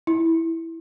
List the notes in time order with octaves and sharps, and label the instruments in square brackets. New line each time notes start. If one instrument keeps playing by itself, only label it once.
[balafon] E4